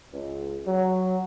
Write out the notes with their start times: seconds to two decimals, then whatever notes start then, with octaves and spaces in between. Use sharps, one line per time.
0.12 C#2
0.67 F#3